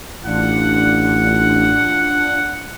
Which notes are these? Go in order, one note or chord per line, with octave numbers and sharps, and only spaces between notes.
A1 D4 F4 F#5